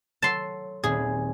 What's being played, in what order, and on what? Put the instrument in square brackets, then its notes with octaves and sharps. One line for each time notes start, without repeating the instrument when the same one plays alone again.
[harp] F#3 A4 [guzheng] A5 C6
[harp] D#1 C4 B5 [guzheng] G#4